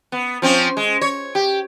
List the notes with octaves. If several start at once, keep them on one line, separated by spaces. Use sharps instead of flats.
B3
F3 C4 C#4
G#3
C#5
G4